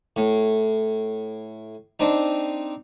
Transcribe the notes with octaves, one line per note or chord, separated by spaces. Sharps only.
A2
C4 D4 D#4